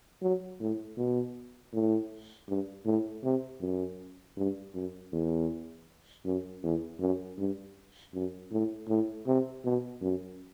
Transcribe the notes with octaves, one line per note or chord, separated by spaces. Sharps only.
F#3
A2
B2
A2
G2
A2
C3
F#2
G2
F#2
E2
F#2
E2
F#2
G2
F#2
A2
A2
C3
B2
F#2